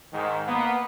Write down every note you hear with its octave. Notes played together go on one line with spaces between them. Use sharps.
G#2 D#3
A#3 B3